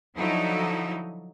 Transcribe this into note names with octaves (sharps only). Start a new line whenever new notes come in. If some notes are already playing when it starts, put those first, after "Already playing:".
D3 F3 F#3 D#4 E4 A4